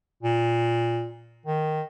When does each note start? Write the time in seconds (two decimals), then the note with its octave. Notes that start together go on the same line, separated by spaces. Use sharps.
0.23 A#2
1.46 D#3